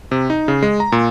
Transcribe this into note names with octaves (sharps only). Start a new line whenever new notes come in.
C3
D#4
C#3
G#3
A#5
A#2